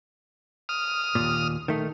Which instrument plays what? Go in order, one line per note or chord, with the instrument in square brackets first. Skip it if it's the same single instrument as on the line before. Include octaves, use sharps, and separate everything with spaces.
[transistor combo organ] D#6 F6
[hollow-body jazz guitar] D#2 A#2
D#3 A3